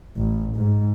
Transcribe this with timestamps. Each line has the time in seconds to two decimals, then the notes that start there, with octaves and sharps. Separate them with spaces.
0.18 A1
0.57 G#2